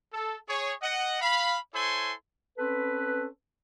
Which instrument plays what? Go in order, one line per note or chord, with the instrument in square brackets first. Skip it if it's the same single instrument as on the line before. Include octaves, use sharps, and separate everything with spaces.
[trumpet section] A4
G#4 C#5
D#5 F#5
F5 B5
E4 A4 C5 C#5 G#5 C6
[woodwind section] C4 C#4 A4 B4